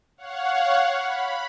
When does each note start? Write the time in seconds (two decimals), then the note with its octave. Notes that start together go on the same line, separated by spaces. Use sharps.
0.17 C#5 F5 F#5
0.96 B5